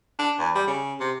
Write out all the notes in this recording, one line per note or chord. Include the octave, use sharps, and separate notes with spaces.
D4
E2
G3
C#3
C3